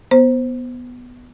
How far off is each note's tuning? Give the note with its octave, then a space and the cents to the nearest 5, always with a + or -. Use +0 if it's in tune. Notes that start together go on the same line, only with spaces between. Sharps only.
B3 +0 C5 +0